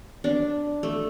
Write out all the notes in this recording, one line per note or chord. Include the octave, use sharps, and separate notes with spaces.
D4
A3